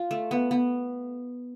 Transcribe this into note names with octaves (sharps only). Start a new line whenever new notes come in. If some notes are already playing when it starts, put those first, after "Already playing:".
Already playing: F4
A3
B3
B3